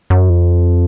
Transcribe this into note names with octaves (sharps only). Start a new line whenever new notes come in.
F#2
F2